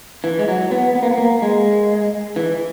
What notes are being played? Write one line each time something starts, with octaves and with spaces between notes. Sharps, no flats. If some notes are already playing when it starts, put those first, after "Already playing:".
E3
G#3
F#3
B3
B3
A#3
B3
A#3
G#3
E3